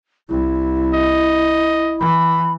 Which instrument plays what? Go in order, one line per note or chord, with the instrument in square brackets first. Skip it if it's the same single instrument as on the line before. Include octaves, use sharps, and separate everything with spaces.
[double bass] C2 [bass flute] E4
[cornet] D#5
[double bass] E3 [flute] B5